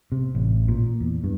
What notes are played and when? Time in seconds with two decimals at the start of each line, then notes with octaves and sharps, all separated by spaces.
0.12 C3
0.35 A1
0.68 A#2
1.00 E2
1.24 G2